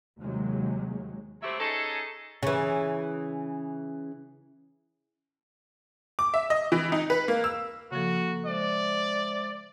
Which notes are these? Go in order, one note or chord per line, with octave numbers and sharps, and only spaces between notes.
D#2 C3 F#3 G#3
F#3 A3 C4 E4 G4 E5
C#4 D#4 G#4 A4
C#3 E3
D6
E5
D#5
E3
D#4
B4
A#3
E6
C#3 F3 A#3 F#4 A4
G#3 C5 D5 E5